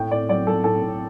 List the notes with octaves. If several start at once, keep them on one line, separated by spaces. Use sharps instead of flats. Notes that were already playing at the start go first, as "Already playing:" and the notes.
Already playing: A2 G5
A2 D5
F#3 D5
F#3 A4
A2 A4
A2